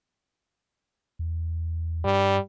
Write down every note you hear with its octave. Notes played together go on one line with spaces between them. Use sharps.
E2
G2 G3